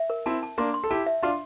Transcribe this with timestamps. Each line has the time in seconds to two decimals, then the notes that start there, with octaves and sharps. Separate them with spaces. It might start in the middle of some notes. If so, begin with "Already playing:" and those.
Already playing: E5
0.10 A#4
0.26 C4 E4 A5
0.43 A5
0.58 A#3 D4 C6
0.74 C6
0.84 A4
0.90 E4 G4 A5
1.06 E5
1.23 D4 F4 C6